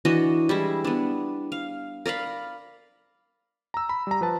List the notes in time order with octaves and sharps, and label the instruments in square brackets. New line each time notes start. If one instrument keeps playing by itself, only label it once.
[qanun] E3 D4 F#4 D#5
G3 G#3 E4
B3 D4
F5
A#4 D5 F5 B5
[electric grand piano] A#5 E6
B5
G3 A#5
F3 B4 A5